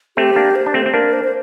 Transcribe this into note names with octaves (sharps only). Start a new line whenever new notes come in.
A3 C4 G4
A#3 D4
C5
D4
A3 C4
C4
A#3 D4 A#4
C5
C5